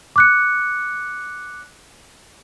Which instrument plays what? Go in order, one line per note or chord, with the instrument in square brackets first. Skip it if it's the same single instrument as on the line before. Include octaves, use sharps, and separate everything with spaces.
[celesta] D6 F#6 C#7